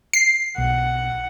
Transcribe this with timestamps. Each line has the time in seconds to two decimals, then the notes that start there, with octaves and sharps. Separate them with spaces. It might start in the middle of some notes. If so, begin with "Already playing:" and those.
0.13 C7
0.58 B1 F#5